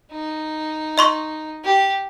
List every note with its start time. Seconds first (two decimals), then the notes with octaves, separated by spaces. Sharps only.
0.12 D#4
0.98 D#5 C6 C#6
1.64 G4